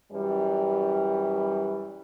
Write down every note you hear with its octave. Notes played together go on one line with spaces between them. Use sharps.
F#2 E3 G3